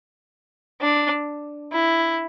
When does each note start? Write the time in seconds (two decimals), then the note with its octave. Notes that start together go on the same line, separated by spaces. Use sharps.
0.81 D4
1.72 E4